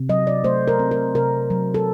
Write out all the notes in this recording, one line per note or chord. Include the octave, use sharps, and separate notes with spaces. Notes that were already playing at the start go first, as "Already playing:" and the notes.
Already playing: C3
F#3 D#5
D5
A3 C5
A#4
C4
A#4
C3 A#4
F#3
A4